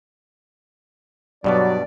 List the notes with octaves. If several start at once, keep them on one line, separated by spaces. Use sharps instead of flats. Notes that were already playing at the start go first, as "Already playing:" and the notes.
G2 B2 F#3 B3 D5